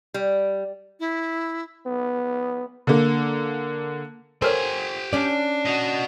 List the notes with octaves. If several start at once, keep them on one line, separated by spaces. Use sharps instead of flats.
G3
E4
B3
D3 A#3
G4 A4 A#4 C5 C#5 G#5
C#4 D4 D5
F#4 D#5